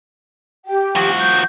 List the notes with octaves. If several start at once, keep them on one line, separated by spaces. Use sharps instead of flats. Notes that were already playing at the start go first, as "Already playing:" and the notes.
G4 G5
F3 F#4
G6